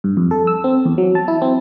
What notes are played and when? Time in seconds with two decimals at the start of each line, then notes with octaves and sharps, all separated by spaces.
0.04 G2
0.17 F2
0.31 A4
0.47 E6
0.64 C4
0.85 E2
0.98 F#3
1.15 A5
1.28 E4
1.42 C4